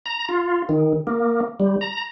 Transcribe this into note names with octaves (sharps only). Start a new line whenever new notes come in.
A#5
F4
D#3
A#3
G3
A#5